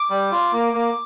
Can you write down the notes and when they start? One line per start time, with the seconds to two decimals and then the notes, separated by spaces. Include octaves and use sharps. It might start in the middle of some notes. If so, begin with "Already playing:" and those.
Already playing: D6
0.10 G3
0.32 F4
0.52 A#3
0.73 A#3